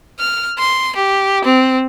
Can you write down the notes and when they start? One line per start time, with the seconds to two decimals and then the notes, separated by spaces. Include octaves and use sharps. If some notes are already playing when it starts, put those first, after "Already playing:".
0.19 F6
0.58 C6
0.96 G4
1.44 C4